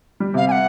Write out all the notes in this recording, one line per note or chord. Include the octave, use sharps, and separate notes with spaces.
G3
C3 F5
G#5
F#5